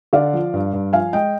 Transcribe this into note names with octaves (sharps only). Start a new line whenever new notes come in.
D3 D5 F5
F3
G2
G2
F3 F5 G#5
G#3 D#5 G5